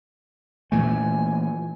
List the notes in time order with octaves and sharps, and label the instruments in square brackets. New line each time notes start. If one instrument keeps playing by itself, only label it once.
[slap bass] A#2 E3 A3 [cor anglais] G#5